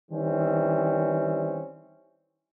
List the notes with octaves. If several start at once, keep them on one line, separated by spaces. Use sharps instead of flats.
D#3 E3 G3 C4 C#4